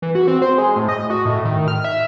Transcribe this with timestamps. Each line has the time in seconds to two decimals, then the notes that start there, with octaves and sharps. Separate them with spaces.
0.02 E3
0.15 F#4
0.28 C4
0.42 C5
0.58 G#3
0.76 A2
0.89 D#5
1.10 F#4
1.25 A2
1.45 D#3
1.68 F6
1.84 E5